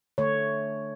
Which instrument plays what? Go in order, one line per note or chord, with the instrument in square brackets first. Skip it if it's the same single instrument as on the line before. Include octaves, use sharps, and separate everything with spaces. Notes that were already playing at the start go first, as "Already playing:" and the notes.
[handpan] D3 A3 C#5